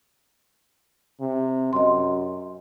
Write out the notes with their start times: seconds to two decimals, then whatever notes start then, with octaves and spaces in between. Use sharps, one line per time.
1.21 C3
1.73 F#2 D#5 C6